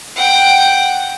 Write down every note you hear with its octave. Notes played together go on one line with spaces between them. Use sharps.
F#5 G5